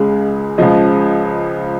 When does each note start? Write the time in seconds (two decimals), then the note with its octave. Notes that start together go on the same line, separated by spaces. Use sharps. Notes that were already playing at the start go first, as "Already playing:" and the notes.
Already playing: C#2 C#3 G#3
0.58 C#2 C#3 F3 D#5